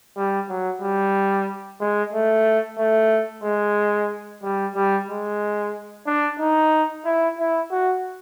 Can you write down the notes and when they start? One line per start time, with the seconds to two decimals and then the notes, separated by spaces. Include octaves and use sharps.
0.17 G3
0.49 F#3
0.81 G3
1.80 G#3
2.13 A3
2.78 A3
3.44 G#3
4.43 G3
4.76 G3
5.09 G#3
6.07 D4
6.39 D#4
7.05 E4
7.38 E4
7.71 F#4